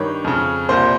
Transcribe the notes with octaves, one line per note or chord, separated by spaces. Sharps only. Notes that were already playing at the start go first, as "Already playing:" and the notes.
Already playing: G2 D#3 C#5
F2 C#3
C2 A#2 C5